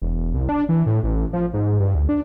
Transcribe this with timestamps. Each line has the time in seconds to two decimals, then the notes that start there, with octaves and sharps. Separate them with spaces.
0.02 E1
0.34 C2
0.49 D4
0.69 E3
0.86 A2
1.03 A1
1.33 F3
1.53 G#2
1.80 G2
1.95 D2
2.09 D4